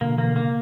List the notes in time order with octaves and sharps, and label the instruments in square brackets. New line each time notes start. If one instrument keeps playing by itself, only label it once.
[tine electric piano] B2 D3 [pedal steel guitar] A#3
[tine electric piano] E3 [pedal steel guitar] A#3
[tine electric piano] D3
[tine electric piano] C#3 [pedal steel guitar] A#3